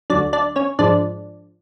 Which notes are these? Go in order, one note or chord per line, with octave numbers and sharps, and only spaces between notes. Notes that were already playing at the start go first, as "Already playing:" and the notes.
D2 D3 F#3 D4 D5
D4 D5
C#4 C#5
G#2 F3 G#3 D4 D5